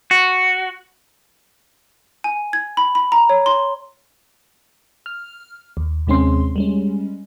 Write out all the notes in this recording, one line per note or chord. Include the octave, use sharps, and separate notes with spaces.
F#4
G#5
G#6
B5
B5
A#5
C#5
C6
F6
D#2
D#2 C3 G#3 C4 C#4 C6
G3 G#3 C#4